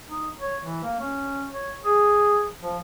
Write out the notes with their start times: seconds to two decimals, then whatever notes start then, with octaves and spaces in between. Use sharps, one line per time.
0.06 D#4
0.39 C#5
0.63 E3
0.83 A#3
0.99 C#4
1.52 C#5
1.85 G#4
2.62 F3